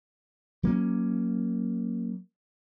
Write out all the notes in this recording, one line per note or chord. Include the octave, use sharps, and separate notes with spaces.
F#3 A#3 C#4